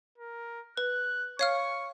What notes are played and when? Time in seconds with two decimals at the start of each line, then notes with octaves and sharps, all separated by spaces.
0.18 A#4
0.77 B4 F#6
1.39 C#5 F5 C#6 F6